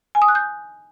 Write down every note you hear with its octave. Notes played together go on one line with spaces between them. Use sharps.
G#5
D#6
F#6
G6